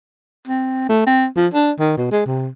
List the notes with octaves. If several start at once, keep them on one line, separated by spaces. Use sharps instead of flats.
C4
A3
C4
F3
D4
D#3
B2
G#3
C3